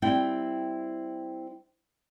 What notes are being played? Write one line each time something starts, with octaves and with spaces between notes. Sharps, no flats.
G3 C4 E4 G5